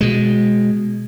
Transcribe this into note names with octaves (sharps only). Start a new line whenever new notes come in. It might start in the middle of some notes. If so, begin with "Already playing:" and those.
B2 G#3